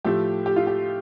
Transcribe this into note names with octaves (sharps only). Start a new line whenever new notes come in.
A2 F3 A3 G4
G4
F4
G4